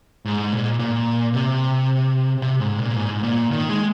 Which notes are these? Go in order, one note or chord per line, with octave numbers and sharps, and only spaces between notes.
G#2
A#2
A#2
C3
C3
G#2
A#2
G#2
A#2
D#3
G#3